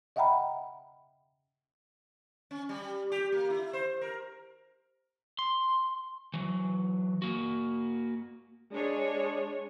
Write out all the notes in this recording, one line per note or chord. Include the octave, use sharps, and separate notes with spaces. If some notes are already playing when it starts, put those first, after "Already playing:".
D#5 E5 F#5 G5 A#5 B5
C#4
G3
G4
A#3
E4
C5
A#4
C6
E3 F#3
A#3 F#4
G#3 D4 G#4 C#5